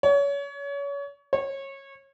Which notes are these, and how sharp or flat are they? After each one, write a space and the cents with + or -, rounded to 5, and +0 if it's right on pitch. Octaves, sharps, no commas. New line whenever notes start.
C#5 +30
C#5 -25